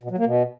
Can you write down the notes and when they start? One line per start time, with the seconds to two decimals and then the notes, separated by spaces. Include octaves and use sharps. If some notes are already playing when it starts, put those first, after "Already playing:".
0.03 B2
0.11 F#3
0.18 A#3
0.26 B2